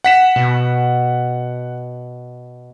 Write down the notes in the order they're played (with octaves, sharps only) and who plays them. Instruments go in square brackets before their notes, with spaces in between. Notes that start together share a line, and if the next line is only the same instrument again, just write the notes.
[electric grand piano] F#5 B6 E7
[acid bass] B2